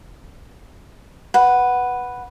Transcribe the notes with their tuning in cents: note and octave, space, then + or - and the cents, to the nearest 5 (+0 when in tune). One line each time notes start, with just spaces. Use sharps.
B4 +0 F#5 +0